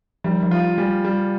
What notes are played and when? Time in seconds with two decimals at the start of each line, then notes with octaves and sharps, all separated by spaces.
0.24 F3 G3
0.43 F3
0.51 F4
0.78 G3 A3
1.04 G3